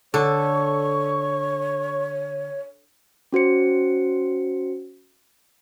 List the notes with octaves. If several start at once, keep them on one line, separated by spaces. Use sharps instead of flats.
D3 A4 C#5 C#6
C#4 F#4 C5 C#7